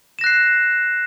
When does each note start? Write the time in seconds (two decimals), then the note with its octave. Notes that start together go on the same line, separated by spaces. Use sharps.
0.19 E7
0.21 A#6
0.24 F#6
0.26 C7